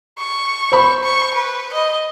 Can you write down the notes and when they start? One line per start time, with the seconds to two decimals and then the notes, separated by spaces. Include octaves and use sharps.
0.19 C#6
0.72 C5 B5
1.04 C#6
1.35 B4
1.74 D#5